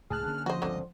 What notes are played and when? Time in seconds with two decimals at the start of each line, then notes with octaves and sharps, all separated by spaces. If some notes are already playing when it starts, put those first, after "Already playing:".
0.10 C#2 A2 G#4 A5 F6 F#6
0.26 D3 A#3 C#4
0.46 F3 F#4 C5 D#5
0.62 G1 C#2 D3 C4 C5